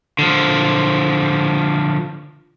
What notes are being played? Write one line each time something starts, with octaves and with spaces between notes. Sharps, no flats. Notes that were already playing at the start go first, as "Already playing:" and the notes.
D3 F3